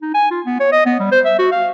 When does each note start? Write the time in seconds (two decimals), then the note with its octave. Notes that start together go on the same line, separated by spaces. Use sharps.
0.02 D#4
0.14 G#5
0.31 F4
0.46 B3
0.60 C#5
0.72 D#5
0.86 B3
1.00 G3
1.12 C5
1.25 E5
1.39 F#4
1.52 F5